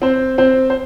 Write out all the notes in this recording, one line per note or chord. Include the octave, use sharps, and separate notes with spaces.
C4 C5
C4 C5
C5